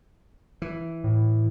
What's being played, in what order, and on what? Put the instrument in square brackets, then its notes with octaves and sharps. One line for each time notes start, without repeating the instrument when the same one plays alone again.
[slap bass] E3
[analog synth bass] A2